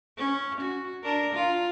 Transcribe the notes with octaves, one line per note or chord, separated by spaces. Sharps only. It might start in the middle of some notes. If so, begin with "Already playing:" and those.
C#4
F#4
D4 A#4
F4